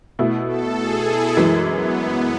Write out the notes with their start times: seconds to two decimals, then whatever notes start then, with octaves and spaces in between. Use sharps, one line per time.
0.19 B2 A3 E4
0.48 A4
0.78 G#4
1.08 E4
1.37 F#2 E3 G#3 D4
1.66 B3
1.97 B3